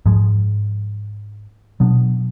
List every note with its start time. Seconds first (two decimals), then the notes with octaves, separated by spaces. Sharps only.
0.06 G#2 F3 G#3
1.80 B2 F#3 B3 D4